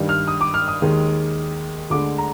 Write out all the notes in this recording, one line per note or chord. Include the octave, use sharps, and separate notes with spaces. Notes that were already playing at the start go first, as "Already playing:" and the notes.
Already playing: G2 D#3 G3
F6
D#6
D6
F6
D#6
D#2 D#3 G#3
D2 D3 G#3 D6
A#5